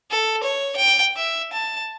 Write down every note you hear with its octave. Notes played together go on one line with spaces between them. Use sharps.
A4
C#5
G5
E5
A5